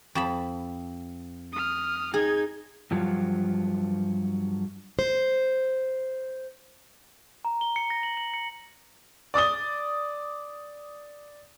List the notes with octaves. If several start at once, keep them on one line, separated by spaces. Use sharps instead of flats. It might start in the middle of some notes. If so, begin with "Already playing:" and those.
F2 A5 B5
D#6 F6
D#4 G#4 G#6
G2 F3 F#3
C5
A#5
G7
C#7
A#6
F#7
F#7
C#7
D5 D6 D#6 G7